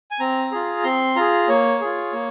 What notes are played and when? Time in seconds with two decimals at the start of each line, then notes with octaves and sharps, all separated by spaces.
0.11 G#5
0.20 C4 A#5
0.52 F4 G#4
0.84 C4 C6
1.16 F4 G#4 A#5
1.48 A#3 C#5
1.81 F4 G#4
2.13 A#3